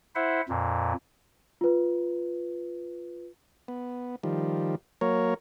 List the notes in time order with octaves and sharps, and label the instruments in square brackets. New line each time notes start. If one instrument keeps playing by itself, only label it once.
[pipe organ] E4 C5 E5 F#5
F2 A#2
[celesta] F4 B4
[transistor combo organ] B3
D#3 F3 G3
F#3 A#3 A#4 C#5